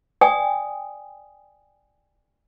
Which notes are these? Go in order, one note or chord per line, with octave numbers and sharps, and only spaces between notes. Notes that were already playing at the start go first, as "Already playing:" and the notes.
D5 G5 G#5 D#6